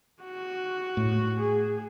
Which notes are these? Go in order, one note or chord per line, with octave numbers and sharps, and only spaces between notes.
F#4
A2
G#4